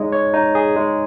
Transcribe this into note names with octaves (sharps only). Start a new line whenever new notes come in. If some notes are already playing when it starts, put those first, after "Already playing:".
Already playing: G#3 D#4 G#4 C#5
C#5
D#4
G#4
G#3